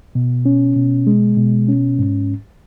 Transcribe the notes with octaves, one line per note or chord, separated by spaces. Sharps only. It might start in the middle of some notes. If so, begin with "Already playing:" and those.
B2
C#4
B2
G#3
B2
C#4
G#2